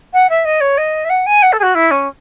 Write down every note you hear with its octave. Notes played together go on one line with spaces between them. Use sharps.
F#5
E5
D#5
C#5
D#5
E5
F#5
G#5
F#5
A4
G#4
F#4
E4
C#4